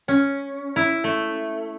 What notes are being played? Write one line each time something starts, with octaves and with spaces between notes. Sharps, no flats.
C#4
E4
A3